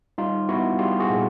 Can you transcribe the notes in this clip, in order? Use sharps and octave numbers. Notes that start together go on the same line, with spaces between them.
G3 D#4 F4
B3 E4 F#4
G3 F4 G4
F#4 G#4
A#2